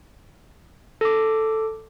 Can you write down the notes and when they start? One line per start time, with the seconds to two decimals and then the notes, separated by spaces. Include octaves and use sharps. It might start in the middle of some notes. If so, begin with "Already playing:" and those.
1.01 A4 D6